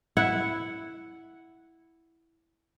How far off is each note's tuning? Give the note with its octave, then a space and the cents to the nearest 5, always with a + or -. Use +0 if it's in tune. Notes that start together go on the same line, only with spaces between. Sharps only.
E4 +0 F#5 +0